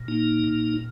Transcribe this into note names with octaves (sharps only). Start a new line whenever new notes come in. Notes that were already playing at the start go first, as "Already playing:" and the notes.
Already playing: A#2
A#3 D#4
A#2